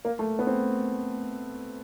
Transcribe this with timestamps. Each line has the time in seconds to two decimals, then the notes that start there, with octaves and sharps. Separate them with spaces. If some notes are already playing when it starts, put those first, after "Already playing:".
0.05 A#3
0.19 A3
0.39 B3
0.47 C4